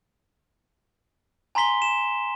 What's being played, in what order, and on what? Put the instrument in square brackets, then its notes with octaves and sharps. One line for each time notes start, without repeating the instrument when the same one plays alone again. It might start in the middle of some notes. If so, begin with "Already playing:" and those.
[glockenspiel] G#5 A#5 C6 B6 G7
E7